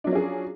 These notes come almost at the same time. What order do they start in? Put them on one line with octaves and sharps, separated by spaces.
D4 F#3 F3 C#4 G#4